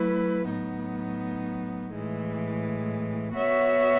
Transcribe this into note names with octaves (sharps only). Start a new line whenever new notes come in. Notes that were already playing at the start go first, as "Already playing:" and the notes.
Already playing: F#3 A3 E4 B4
A2 F#3 B3 D#4
A2 E3 G#3
B3 F#4 C#5 E5